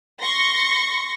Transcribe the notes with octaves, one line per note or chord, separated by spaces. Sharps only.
C6 C#6 A#6